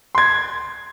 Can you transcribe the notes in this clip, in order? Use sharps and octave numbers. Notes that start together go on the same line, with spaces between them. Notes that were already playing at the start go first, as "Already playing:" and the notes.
C6 G#6